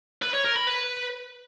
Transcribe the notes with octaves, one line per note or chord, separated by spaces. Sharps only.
B4
C#5
A#4
B5
B4